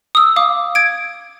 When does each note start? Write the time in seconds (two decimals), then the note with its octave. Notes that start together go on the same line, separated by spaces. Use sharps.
0.15 D#6 E6
0.36 F5 D6 D#6
0.75 G#6 D7